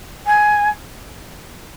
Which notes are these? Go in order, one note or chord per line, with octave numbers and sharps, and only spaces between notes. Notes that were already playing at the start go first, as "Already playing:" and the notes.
G#5